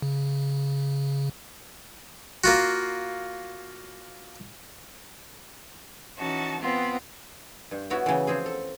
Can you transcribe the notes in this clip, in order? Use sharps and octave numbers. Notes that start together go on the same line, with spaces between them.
C#3
A#3 F4 F#4
E3 C#4 D#4 F#4 A5
B3 C4 F4
G2
B3 E4 F#4 C#5
C#3 E3
F3 C4 G#4
A4